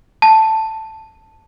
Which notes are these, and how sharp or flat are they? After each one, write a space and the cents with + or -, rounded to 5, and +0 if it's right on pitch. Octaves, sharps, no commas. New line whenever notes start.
A5 +5